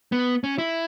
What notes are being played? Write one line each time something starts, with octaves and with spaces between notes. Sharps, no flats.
B3
C#4
E4